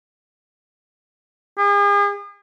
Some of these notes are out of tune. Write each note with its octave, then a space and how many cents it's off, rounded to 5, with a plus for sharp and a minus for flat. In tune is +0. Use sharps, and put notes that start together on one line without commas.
G#4 -40